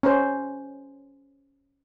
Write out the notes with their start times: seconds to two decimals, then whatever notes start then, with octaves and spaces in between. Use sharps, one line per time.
0.03 C#4 C5